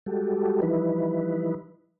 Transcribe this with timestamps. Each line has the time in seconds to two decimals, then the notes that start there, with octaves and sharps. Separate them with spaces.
0.06 G3 G#3 F#4 G4 A4
0.62 E3 F3 G3 D#4 E4 B4